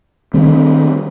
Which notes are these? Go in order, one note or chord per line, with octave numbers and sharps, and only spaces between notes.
D#3 G3 C4